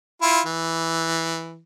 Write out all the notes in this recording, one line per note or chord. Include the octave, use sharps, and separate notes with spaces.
E4 F4
E3